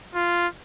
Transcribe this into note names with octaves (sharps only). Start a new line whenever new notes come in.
F4